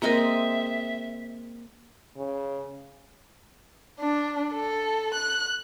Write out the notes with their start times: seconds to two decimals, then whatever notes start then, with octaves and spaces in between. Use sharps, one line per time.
0.02 G#3 A#3 C4 A#4 D#5 E5
2.17 C#3
4.00 D4
4.53 A4
5.14 F#6